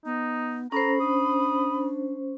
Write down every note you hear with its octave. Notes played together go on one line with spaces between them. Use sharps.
B3 D#4
C#4 A4 C5 A#5 B5
D4 D#6